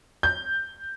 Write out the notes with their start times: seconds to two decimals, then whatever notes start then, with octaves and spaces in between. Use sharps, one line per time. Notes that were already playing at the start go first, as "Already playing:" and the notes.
0.23 G6